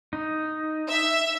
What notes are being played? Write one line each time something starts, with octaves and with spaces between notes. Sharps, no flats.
D#4
E5